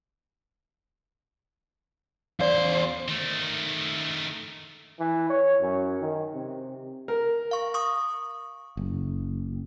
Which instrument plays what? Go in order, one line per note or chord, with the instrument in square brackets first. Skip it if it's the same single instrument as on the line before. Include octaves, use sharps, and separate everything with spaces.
[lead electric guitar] E2 C5 [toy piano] D5 F5
[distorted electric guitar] D#3 A3
[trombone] E3
C#5
F#2
D#3
C3
[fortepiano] A#4
[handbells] F5 C#6
C#6 D#6
[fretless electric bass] F#1